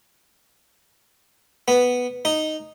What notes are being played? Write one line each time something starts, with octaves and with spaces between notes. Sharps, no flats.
B3
D#4